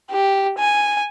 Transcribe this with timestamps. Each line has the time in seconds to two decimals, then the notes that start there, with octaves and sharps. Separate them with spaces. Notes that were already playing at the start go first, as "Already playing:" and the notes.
0.11 G4
0.58 G#5